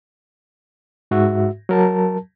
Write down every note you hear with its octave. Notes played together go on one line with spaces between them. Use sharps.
G#2 F#4 E5
F#3 A#4 A5